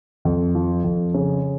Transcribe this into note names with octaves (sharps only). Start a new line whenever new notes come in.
F2
F3
F2
C#3